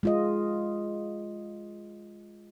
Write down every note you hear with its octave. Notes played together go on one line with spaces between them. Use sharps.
G#3 F4 D#5